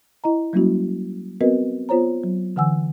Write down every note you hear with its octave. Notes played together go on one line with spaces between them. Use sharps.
E4 D#5 A#5
F#3 G3 A#3 C#4 E4 F#4
B3 C4 F#4 A#4 B4 D#5
B3 F4 C5 C#5 A#5
F#3
D3 E3 F#5 G#5 E6